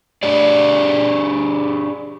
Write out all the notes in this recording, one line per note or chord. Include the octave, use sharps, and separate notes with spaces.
D4 G4 G#4 D5